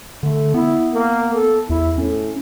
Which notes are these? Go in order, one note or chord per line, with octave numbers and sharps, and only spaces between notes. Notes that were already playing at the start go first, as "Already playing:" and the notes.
D3 A3
B3 E4
A#3
A4
E2 E4
A2 C#4